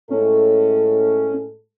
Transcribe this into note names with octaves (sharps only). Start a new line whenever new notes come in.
A2 G#3 C#4 A4